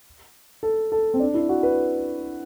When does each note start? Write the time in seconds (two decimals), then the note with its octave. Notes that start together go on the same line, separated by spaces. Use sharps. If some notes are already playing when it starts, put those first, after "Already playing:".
0.63 A4
0.92 A4
1.14 C4
1.20 D4
1.34 E4
1.49 F#4
1.63 B4